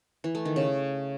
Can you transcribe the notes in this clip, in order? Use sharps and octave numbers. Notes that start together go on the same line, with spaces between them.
E3
A3
D#3
C#3